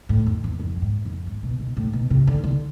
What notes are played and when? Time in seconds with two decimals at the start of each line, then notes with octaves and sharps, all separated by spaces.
0.09 A2
0.26 F2
0.44 E2
0.60 F2
0.76 A2
0.82 G#2
1.05 F2
1.26 G#2
1.43 B2
1.60 B2
1.77 A2
1.93 B2
2.10 C3
2.27 D3
2.44 D3